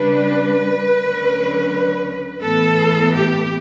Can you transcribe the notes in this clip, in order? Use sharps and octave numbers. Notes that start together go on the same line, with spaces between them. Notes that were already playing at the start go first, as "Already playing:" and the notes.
Already playing: C#3 G3 D4 B4
D2 D3 F#3 C#4
A2 E3 B3 A4
G4